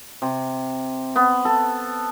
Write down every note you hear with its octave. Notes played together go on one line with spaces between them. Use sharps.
C3
B3
A4